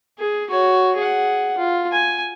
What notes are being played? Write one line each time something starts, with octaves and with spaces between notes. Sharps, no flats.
G#4
F#4 C#5
G#4 F#5
F4
G#5